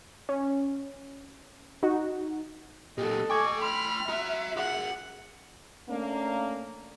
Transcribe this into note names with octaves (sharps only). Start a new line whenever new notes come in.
C#4
D#4 F#4
A#2 F#3 G4 A4 D#5
A3 G5 G#5 C#6 D6 G#6
B5 C6 F6
F#4 E5 A#5
F#4 G#4 F#5
A3 A#3 C#4 D4